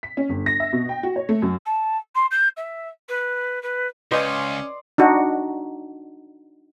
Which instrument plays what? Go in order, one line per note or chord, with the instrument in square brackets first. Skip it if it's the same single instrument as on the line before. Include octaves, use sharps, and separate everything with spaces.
[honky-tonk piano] B6
C#4
G1
A#6
E5
B2
G5
F#4
C#5
A3
F#2
[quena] A5
C6
G6
E5
B4
B4
[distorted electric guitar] C#2 [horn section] C#4 [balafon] B4 D#5 [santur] D5 C6 D#6
[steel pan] D4 D#4 F#4